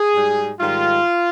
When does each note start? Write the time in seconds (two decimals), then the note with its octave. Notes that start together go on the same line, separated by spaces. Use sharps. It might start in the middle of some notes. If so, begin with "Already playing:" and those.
Already playing: G#4
0.14 G#2 G3
0.60 G#2 D#3 G3 F4